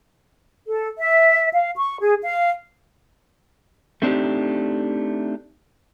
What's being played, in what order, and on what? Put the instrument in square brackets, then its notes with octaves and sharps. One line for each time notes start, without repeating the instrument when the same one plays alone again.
[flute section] A4
E5
F5
C#6
G#4
F5
[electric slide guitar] A3 C4 D4 D#4 G4